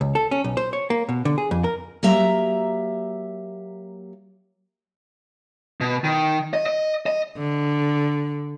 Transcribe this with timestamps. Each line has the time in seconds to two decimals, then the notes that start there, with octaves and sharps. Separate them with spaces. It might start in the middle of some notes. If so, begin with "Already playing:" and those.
0.01 C#2
0.15 A4
0.31 C#4
0.44 B1
0.57 C5
0.73 C#5
0.90 A#3
1.09 B2
1.25 D3
1.38 G#4
1.51 F2
1.64 A#4
2.03 F#3 A#3 G4 E5 A#5
5.81 B2
6.04 D#3
6.53 D#5
6.66 D#5
7.06 D#5
7.38 D3